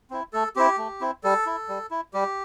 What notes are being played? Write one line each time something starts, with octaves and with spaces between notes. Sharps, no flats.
C4 E4
A3 A4
C4 E4 G4
A3
C4 E4
G3 A4
E4
G3
E4
G3 G4